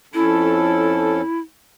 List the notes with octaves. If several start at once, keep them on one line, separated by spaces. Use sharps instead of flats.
F2 C#4 E4 A4